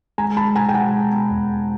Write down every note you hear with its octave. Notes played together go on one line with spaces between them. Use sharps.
G#3 G#5 A#5
G#3 A5 B5
B2 G#5 A#5
G5
G#3 F#5 G#5
B2
B3
E2
E2